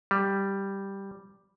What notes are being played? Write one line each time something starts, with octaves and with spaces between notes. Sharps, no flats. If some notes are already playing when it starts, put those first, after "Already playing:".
G3